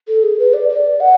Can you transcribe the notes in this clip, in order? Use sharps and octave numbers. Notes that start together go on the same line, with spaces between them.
A4
G#4
B4
D5
D5
F#5